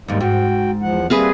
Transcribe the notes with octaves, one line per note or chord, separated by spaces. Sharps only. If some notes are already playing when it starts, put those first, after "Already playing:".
D#2 G#2 G3 A#3 D#4
G#2 F#4 G5
E2 F3 F#5
G3 A#3 C4 G#4 B4 E5